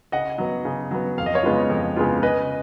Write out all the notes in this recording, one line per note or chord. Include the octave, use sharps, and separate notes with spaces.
C#3 D#5 F#5
F#3 B3
C#3
F#3 B3
F2 F5
D#5
C#5 F5
C#3 G#3 B3 F4
F2
C#3 G#3 B3 F4
C#3 B4 D#5